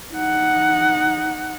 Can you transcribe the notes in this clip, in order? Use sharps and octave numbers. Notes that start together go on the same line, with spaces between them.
D#4 F#5